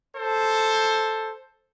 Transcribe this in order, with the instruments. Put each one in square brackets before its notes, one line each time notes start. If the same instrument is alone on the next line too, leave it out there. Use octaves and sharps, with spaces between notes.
[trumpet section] A4 C5